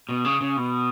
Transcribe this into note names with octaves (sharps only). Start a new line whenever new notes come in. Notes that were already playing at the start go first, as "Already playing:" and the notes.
B2
C#3
C#3
B2